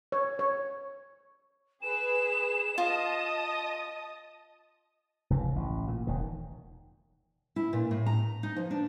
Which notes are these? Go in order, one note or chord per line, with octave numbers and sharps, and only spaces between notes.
C#5
C#5
G#4 B4 E7
F4 D#5 A5 D#6
F1 C#2 E3
A1
A#2
E1 D#3
E4
A#2
A2
A#5
D#4
F3
D4